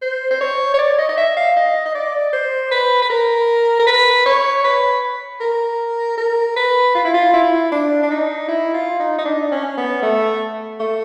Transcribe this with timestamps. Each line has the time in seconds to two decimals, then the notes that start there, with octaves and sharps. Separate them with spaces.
0.02 C5
0.31 C5
0.41 C#5
0.74 C#5
0.79 D5
0.98 D#5
1.09 D#5
1.17 E5
1.36 F5
1.56 D#5
1.85 D#5
1.94 D5
2.33 C5
2.71 B4
3.02 B4
3.10 A#4
3.80 A#4
3.87 B4
4.25 C#5
4.64 B4
5.41 A#4
6.18 A#4
6.56 B4
6.95 F4
7.05 E4
7.14 F4
7.33 E4
7.72 D4
8.03 D4
8.10 D#4
8.48 E4
8.74 F4
8.99 D#4
9.18 D#4
9.25 D4
9.51 C#4
9.77 B3
10.02 A3
10.80 A3